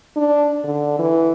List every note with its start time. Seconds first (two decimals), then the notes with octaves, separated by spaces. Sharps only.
0.17 D4
0.64 D3
0.99 E3